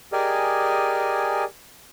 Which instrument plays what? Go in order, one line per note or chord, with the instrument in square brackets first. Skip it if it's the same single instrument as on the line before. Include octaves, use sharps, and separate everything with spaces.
[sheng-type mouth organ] G4 G#4 A#4 D5 D#5 G#5